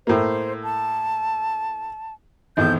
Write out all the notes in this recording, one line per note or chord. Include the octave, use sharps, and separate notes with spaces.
A2 A#3 C5
A5
G#1 E2 A2 G6